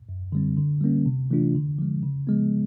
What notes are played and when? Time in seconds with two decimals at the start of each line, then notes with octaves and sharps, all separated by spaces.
0.09 F#2
0.32 D3 G3 C4
0.57 D3
0.81 G3 A#3 C#4
1.06 C3
1.31 E3 A3 D4 F4
1.55 D3
1.79 F3 G#3
2.03 C#3
2.27 F3 G#3 B3